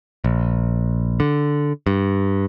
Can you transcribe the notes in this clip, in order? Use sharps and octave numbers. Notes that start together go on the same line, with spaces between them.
A#1
D3
G2